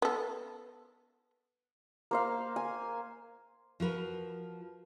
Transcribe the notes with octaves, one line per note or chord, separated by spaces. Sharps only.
B3 A4
A#3 C5 F5
G#5
F3 F#4 A#4 B4